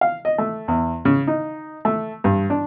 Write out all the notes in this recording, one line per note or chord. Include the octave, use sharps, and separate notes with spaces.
F5
D#5
A3
E2
C#3
D#4
A3
G2
D4